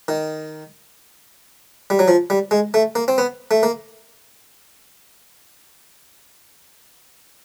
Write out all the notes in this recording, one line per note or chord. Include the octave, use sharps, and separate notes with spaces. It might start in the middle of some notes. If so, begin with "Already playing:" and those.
D#3
G3
F#3
F3
G3
G#3
A3
A#3
C4
B3
A3
A#3